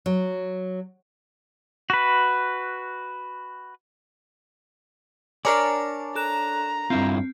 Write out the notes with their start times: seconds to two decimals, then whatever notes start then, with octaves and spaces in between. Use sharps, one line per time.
0.06 F#3
1.90 F#4 B4
5.45 D4 A#4 C#5 D5 G#5 A5 D6
6.15 A4 A#5 F#6 E7
6.90 G2 C4 E4 F4